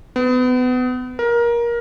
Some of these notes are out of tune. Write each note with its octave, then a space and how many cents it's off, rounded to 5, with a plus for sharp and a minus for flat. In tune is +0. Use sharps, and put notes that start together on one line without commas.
B3 +30
A#4 +20